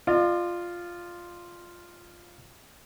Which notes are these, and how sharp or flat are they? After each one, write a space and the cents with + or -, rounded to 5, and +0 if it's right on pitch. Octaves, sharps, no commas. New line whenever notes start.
F4 +0 D5 +45